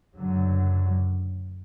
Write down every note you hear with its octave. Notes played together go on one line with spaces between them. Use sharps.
F#1 F#2 D3 F#3